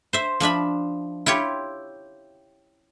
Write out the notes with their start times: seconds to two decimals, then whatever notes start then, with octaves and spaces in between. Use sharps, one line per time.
0.13 C5 E5
0.40 F3 D4 E5 B5
1.26 E4 F4 G4 C#5